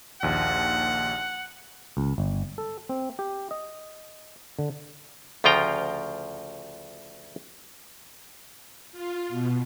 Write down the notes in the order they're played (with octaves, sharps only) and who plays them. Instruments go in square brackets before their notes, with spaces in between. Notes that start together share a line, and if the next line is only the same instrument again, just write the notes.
[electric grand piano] A#1 D#2 [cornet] F#5
[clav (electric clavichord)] C#2
G1
A4
C4
G4
D#5
D3
D2 C#3 F3 F4 G5 A#5
[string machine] F4
B2